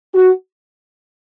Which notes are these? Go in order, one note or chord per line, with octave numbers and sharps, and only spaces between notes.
F#4